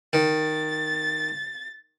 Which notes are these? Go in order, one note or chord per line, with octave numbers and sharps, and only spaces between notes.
D#3 A6